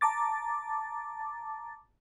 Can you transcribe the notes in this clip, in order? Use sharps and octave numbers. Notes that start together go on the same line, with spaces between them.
A5 A#5 D6 A6